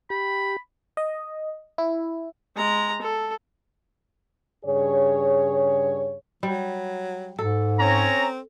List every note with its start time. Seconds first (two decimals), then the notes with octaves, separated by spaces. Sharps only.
0.10 G4 B5
0.97 D#5
1.78 E4
2.56 G#3 A#5
3.02 A4
4.65 G2 C#3 G#4 C#5
6.43 F#3 G3
7.39 G#2 A4
7.80 C4 C#4 C#5 A#5